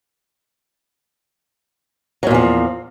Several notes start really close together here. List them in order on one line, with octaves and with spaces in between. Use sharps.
F#3 A#2 E2 F3